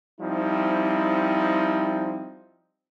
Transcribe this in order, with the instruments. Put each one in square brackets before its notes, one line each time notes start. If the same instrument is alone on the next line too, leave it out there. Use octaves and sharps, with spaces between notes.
[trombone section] F3 G3 C4 D#4 E4